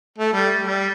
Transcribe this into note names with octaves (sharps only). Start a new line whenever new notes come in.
A3
G3
G3